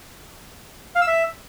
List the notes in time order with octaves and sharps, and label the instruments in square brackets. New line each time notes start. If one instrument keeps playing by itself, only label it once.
[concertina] F5
E6
E5